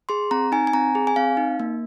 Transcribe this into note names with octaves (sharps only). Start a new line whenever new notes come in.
G#4 C6
C4 A#5
D#4 G#5
G#5
C4 A#5
G#4
G#5
C4 F5
D#4
A#3